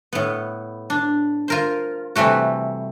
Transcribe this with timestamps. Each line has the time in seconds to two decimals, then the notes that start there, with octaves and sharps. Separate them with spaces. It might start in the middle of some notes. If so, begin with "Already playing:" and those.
0.13 A2 B3
0.90 D4
1.48 F4 A#4 C5
2.15 C3 E3 G3 A3 F#4